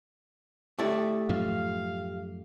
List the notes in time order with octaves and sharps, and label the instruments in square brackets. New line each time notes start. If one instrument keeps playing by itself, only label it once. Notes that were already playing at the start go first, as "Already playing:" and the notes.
[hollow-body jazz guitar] A3 E4 D5 [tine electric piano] G4
[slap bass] F#2 A2 F3 [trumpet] F5